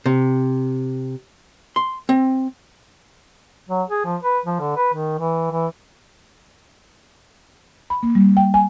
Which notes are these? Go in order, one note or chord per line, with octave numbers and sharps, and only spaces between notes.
C3
C6
C4
F#3
G#4
F3
B4
F3
D3
B4
D#3
E3
E3
B5
A#3
G3
G5
G#5